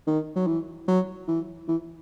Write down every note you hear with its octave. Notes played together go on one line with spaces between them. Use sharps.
D#3
F#3
E3
F#3
E3
E3